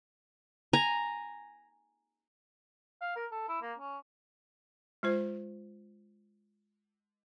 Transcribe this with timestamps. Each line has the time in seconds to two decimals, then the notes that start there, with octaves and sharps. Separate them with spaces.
0.73 G#5 A#5
3.01 F5
3.16 A#4
3.32 A4
3.49 E4
3.62 A#3
3.78 C#4
5.03 G#3 F4 C5